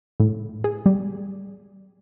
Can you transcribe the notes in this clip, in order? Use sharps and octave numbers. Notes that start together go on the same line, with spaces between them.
A2
G#4
G3